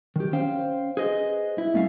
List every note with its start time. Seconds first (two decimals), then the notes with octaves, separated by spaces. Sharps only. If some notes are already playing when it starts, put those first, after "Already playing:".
0.16 D#3 G4
0.33 C#4 C5 F5 G5
0.97 G#4 B4 C5 D#5
1.58 E4
1.74 F#2 A3 C#4 F5